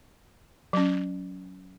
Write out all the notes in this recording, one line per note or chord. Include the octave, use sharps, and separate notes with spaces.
F#3 C#4